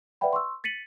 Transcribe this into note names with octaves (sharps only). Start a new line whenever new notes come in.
B4 D5 E5 F#5 G5 B5
C6 C#6 E6
A6 B6 C#7 D#7 F#7